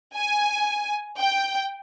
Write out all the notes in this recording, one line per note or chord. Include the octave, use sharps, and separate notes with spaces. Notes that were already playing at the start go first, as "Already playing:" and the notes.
G#5
G5